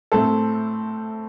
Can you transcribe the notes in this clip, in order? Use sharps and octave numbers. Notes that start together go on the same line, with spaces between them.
A2 A3 C4 A4